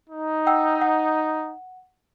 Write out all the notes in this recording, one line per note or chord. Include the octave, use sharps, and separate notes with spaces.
D#4
F#5 G5 E6
F#5